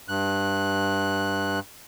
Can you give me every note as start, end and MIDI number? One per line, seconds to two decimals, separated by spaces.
0.08 1.60 43
0.08 1.60 90